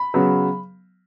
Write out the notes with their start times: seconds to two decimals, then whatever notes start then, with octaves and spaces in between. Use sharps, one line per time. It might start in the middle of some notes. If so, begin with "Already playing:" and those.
Already playing: B5
0.14 C#3 F#3 B3